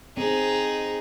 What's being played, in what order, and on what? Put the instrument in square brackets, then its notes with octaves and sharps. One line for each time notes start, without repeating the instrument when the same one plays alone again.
[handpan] C4 [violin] D#4 G#4